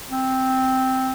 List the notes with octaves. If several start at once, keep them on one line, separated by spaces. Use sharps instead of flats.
C4